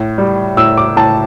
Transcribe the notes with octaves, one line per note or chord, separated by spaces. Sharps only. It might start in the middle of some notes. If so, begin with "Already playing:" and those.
Already playing: A2
G3
A2 E6
D6
A2 A5